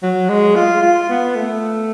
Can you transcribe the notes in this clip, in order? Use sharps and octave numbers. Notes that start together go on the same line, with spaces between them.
F#3
G#3
F4
F4
B3
A3